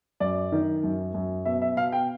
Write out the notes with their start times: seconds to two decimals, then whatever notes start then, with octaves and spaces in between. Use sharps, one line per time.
0.20 F#2 D5
0.52 D#3
0.84 F#2
1.14 F#2
1.45 B2 E5
1.62 E5
1.77 B2 F5
1.92 G5